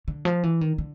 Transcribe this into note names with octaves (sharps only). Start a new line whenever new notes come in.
D3
F3
E3
D#3
D3